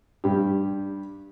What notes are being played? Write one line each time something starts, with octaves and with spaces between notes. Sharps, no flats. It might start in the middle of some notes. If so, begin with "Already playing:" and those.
G2 G4